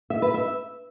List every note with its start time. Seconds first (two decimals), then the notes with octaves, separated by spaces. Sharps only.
0.10 E5
0.22 B4
0.34 E5